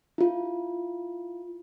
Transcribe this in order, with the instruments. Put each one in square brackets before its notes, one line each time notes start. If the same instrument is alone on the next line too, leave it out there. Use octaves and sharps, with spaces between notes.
[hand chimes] E4 F4